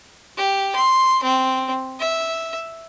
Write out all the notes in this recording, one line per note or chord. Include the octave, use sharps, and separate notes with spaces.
G4
C6
C4
E5